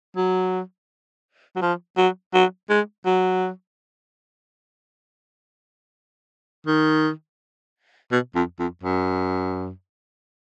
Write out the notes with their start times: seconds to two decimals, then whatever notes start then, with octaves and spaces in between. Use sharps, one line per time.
0.17 F#3
1.56 F#3
1.62 F3
1.97 F#3
2.34 F#3
2.69 G#3
3.06 F#3
6.67 D#3
8.11 B2
8.35 F2
8.59 F2
8.83 F#2